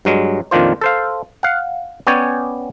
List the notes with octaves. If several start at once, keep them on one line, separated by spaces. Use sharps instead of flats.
G2 F#3 G#3
F2 A#2 D#3 D4 F4 C5
A4 C5 F5
F5 F#5
B3 C#4 C#5 D5 G5 G#5